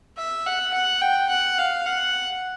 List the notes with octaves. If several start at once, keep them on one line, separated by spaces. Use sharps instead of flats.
E5
F#5
F#5
G5
F#5
F5
F#5